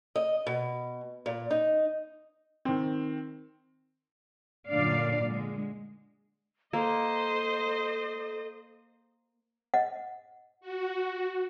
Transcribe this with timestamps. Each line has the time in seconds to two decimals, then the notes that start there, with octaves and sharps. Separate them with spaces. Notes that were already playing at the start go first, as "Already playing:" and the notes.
0.16 D#5
0.47 B2
1.26 A#2
1.51 D#4
2.65 D#3 C4
4.69 F#2 A#2 D3 D4 D5 F5
5.21 D3 G#3
6.73 A#3 A4 C5 D#5
9.74 D#5 F#5
10.61 F#4